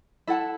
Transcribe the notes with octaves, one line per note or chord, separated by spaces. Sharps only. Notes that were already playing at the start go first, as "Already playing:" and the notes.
E4 A4 F#5 A5